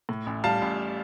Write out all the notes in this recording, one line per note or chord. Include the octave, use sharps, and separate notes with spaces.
A2
A1
G3 F5 A5
A1